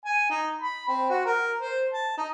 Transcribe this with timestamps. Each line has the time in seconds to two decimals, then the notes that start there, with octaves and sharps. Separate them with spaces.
0.06 G#5
0.30 D#4
0.62 B5
0.89 C4
1.10 F#4
1.26 A#4
1.61 C5
1.94 A5
2.18 D#4